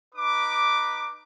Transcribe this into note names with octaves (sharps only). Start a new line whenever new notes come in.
D#4 B4 D6